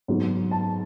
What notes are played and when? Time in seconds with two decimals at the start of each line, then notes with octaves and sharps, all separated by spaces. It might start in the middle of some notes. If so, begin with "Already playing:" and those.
0.08 G#2 F#3 B3
0.51 A5